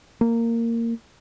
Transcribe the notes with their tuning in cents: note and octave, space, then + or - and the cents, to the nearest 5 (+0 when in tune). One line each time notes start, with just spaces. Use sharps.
A#3 -15